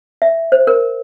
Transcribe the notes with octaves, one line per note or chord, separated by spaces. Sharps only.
E5
C5
A#4